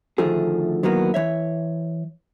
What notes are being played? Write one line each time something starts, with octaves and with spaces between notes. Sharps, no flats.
D2 D#3 F3 A3 G#4
D#3 E3 F#3 A#3 B3
E3 C#5 E5